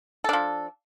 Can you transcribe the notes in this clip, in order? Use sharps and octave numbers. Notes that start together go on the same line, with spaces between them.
F3 D4 A4